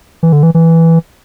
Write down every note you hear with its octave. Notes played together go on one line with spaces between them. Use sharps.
E3
D3
E3
E3